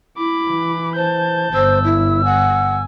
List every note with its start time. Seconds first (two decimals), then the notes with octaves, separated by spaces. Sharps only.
0.17 E4 B5 D6
0.48 E3
0.95 C5 A5 G6
1.54 G1 C5 E6
1.84 E4
2.25 F#5 G#5